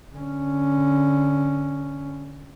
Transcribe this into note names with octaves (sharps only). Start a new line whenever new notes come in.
D3 C#4